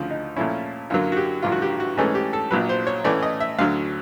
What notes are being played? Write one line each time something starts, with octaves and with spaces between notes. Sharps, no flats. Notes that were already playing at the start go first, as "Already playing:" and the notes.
Already playing: D2 C#3 F3
D#4
A#2 F3 A3 C#4 E4
F#2 D3 F#3 A#3 F4
F#4
G4
A1 G2 D3 F3 F4
F#4
G4
F#4
G#2 E3 A3 C#4 G#4
G4
A4
A#1 A#2 F#3 B4
C5
C#5
A2 E3 A3 C#4 D5
D#5
E5
D2 D3 F#3 F5